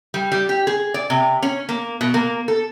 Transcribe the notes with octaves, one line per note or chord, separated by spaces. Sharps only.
G3
G3
G4
G#4
D5
C3
C#4
A#3
B2
A#3
A4